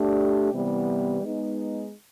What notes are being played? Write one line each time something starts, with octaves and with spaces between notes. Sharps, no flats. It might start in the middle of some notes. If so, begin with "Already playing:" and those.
Already playing: A3 D4 G4
C3 E3 G3 B3
G#3 B3 D#4